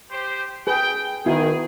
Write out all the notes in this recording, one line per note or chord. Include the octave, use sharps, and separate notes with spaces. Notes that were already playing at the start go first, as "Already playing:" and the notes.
G4 C5
G#4 B4 G5
D#3 B3 E4 F#4 G#4